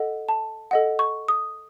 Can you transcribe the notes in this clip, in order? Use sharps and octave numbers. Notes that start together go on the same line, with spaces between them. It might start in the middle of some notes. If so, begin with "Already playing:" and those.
Already playing: A4 D#5 F#5
A5
A4 D#5 F#5
C#6
D#6